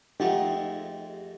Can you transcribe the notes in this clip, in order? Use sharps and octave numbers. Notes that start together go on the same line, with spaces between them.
F2 G#3 A3 D#4 G4 D#5 F#5 G5